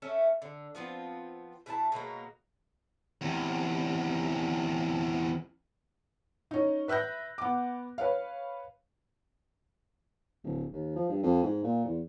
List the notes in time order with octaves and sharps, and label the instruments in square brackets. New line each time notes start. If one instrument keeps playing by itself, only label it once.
[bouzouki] A3 C#4 E5
D3
F3 B3 C4 F4
B2 E4 G#4 A5
B2 F#3 G#3 A#3
[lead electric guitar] E2 C3
[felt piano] C#4 D#4
B4 E5 F#6 G6 A#6
B3 D6
B4 C#5 F5
[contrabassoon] D1
D#2
F3
G2
F2
G#2
A#2
E2